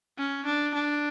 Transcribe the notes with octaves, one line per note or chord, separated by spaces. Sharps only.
C#4
D4
D4